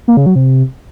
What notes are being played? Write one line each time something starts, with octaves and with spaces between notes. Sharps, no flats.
A#3
C#3
F#3
C3